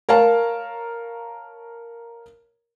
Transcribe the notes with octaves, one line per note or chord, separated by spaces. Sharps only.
A#4 C#5 F5 A5